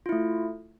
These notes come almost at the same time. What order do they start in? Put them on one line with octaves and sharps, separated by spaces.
F4 E4 A3